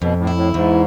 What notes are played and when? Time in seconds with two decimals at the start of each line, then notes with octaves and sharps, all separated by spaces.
0.02 F2 B2
0.19 A2
0.27 E4
0.37 A2
0.54 E2 G#2